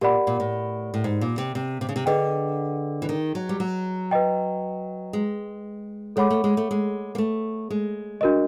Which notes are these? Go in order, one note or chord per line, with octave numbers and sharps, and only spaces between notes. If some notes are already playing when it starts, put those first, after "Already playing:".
A#2 G4 A#4 D5 F#5 B5
A#2
A2
A2
G#2
A#2
C3
C3
C3
C#3
C3
D3 G#4 B4 D#5 G5
E3
D#3
F#3
G3
F#3
B4 D#5 G5
G#3
G#3 A4 C#5 F#5 B5 D6
A3
G#3
A3
G#3
A#3
A3
G#3
D4 F#4 A#4 D#5